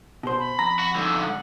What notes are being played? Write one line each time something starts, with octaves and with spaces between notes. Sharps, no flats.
B2 C5
B5
F2 A#5
F#4
G#2 D3 E6
F#5